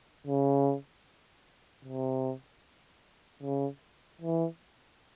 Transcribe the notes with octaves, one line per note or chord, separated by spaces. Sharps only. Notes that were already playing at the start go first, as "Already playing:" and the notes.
C#3
C3
C#3
E3